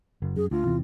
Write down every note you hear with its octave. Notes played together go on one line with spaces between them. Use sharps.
F#1
F#2 G#4
D2 F4
E2 C3 E3